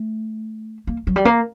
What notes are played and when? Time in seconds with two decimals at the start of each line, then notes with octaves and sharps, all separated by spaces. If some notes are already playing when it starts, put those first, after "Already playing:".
Already playing: A3
0.87 A#3
1.07 F#3
1.16 G3
1.25 A#3